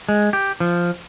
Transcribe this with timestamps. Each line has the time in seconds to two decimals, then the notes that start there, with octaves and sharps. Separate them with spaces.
0.09 G#3
0.33 G4
0.60 F3